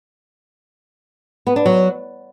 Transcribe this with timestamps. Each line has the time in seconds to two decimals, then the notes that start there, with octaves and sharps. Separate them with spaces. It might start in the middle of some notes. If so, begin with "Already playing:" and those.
1.47 B3
1.56 D4
1.66 F#3